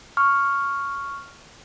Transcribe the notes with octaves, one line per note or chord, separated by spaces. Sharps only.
C#6 F6